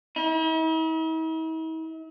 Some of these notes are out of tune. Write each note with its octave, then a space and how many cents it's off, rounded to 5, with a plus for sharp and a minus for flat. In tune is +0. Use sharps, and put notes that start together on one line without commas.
E4 -45